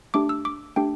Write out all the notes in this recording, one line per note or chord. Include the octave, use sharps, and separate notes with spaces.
A3 D4 G4 D6
E6
D6
A3 D4 G4 G5